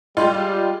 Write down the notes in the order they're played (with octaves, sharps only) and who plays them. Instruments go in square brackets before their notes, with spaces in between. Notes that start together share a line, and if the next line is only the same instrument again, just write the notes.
[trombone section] G3 [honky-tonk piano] G#3 F4 [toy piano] D#5 C6